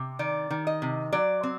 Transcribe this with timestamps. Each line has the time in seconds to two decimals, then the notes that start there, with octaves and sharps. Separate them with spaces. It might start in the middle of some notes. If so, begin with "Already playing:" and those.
Already playing: C3
0.19 D#3 D5
0.50 D#3
0.67 D#5
0.82 C3
1.12 F#3 D5
1.43 C4